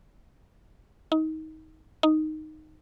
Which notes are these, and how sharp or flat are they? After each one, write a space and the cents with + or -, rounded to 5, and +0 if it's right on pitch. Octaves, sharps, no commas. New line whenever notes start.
D#4 +20
D#4 -5